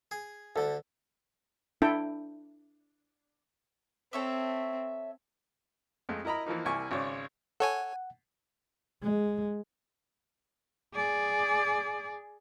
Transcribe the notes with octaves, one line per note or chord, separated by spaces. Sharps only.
G#4
D2 D3 A4
D4 E4 A4 G5
C4 A4 C#5 E5
F2 G#3 A3
E4 A#4 D#5 A#5 B5
E3 F3 A#3 D#4
C2 A#3 E4 D5 G#5 C#6
G#1 C#3 C#5 D5
A4 C#5 F#5 G#5
G#3
G#4 D5